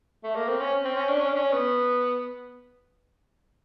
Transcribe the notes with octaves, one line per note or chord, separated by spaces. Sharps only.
A3
A#3
C4
C#4
C4
C#4
D4
C#4
D4
C#4
B3